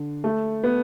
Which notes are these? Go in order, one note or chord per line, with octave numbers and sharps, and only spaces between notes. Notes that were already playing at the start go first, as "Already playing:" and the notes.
Already playing: D3
A3
B3